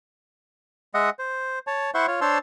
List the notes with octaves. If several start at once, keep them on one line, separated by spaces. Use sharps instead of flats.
G#3 D#5 E5 F#5 D#6
C5
C#5 A5
E4 C5 E5 F#5 C6 C#6
F4 C#5
D4 C5 C#5 A5 C6 E6